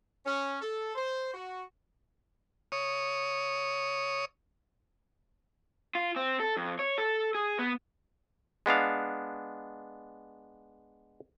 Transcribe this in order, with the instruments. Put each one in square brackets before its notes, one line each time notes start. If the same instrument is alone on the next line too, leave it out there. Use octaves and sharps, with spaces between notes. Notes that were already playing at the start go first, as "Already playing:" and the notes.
[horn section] C#4
A4
C5
F#4
[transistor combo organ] C#5 D#6
[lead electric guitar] F4
C4
A4
F2
C#5
A4
G#4
B3
[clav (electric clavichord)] G#3 B3 D4 F5